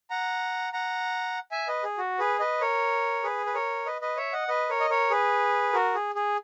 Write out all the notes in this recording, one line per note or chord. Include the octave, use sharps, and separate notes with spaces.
F#5 A#5
F#5 A#5
E5 G#5
B4 D#5
G#4
F#4
G#4 B4
B4 D#5
A#4 C#5
G#4 B4
B4
A#4 C#5
B4 D#5
B4 D#5
C#5 E5
D#5 F#5
B4 D#5
A#4 C#5
D#5
A#4 C#5
G#4 B4
F#4 A#4
G#4
G#4